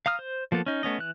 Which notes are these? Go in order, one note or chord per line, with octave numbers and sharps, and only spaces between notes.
F5 A#5 D#6 F6
C5
F3 A#3 B3 A4
C#4 D#4
A3 B3 C#4 D#5
E3 F#6